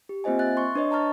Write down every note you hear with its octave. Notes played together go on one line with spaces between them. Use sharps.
G4
A#3 C4 F4 C5 D#5 G#5
E5 F#6 A6
C6 C#6
D4 B4 C#5 D#5
A5 A#5 C#6 F6 A6